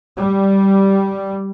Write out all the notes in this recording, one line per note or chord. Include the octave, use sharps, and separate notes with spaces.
G3